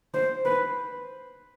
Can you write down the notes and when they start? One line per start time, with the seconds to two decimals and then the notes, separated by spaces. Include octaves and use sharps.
0.14 C5
0.45 B4